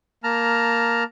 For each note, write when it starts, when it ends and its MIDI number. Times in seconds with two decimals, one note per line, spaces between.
0.24 1.04 58
0.24 1.04 81
0.24 1.04 82
0.24 1.04 89